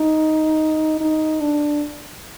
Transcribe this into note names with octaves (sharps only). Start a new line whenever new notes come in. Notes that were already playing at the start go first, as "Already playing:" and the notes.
Already playing: D#4
D#4
D4